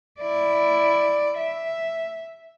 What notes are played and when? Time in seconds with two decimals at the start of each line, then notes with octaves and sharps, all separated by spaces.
0.20 E4 D5
1.38 E5